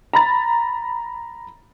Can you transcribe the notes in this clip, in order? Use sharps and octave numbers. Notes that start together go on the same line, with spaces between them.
A#5 B5 A6